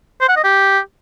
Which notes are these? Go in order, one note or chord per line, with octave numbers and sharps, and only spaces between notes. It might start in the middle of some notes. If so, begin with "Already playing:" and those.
C5
F#5
D#5
G4